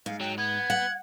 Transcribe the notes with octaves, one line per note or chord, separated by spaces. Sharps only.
G#2 F5
F#3 G5
B3 G#6
F#5